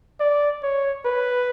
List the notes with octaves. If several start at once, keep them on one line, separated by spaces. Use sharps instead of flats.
D5
C#5
B4